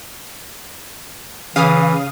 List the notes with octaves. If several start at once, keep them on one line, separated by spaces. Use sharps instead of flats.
C#3 E3 F5 D#6